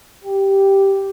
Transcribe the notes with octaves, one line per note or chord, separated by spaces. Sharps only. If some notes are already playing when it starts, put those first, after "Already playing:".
G4